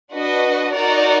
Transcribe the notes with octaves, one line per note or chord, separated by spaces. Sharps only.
D4 F#4 B4 D#5
D#4 F#4 A#4 D5